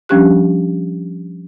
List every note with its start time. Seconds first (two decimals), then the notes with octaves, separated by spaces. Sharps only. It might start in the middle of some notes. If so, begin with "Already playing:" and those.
0.09 F3 G3 C#4 D4 G4 F#6